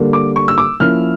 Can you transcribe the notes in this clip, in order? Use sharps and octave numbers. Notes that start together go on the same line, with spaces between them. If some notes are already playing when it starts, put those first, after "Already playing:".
Already playing: D3 G3 A#3
D6
C#6
E6
D6
F3 A#3 C#4 E4 F6